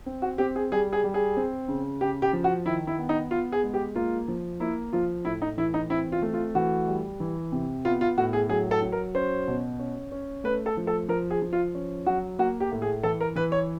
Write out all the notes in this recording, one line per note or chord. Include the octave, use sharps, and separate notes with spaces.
C4
F#4
C4 G4
G#4
G3 G#4
G#4
G3
G#4
C4
C#3
C#3 G4
G4
F3
F#4
D#3 E4
E4
B3
D#4
B3 F4
G#4
G#3
G4
A#3 F4
F3
A#3 E4
F3 F4
A2 E4
D#4
E3 E4
D#4
C4 E4
F4
A3
F4
E3 F#4
G3
E3
C3
B3 F4
F4
A2 F#4
G#4
F#3 G#4
A4
F#3
A#4
C#4 C5
B2
C#4
C#4
A3 B4
A4
F3
A4
F3 A#4
G#4
F3
F4
C#4
F#3 F#4
A#3 F#4
G4
A2
G#4
E3 A4
A#4
E3 B4
C#5